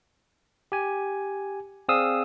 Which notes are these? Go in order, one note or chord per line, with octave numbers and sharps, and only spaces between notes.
G4 G#5
C4 G#4 D5 F5 D#6 E6